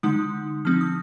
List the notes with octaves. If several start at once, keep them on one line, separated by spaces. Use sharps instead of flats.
D3 G#3 D#4 D#6
F3 C4 D#4 F6
D#6